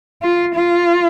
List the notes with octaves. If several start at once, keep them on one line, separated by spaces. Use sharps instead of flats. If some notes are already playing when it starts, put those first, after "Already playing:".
F4
F4